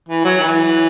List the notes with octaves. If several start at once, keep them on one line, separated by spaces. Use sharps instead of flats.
E3
F#3
E3